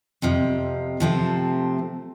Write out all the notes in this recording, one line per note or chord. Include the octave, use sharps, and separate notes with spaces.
F2 C3 F3
C3 F3 A3 C4